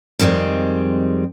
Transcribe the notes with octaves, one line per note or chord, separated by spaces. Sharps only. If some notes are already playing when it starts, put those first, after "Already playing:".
F2 D#3 G3 G#3 C4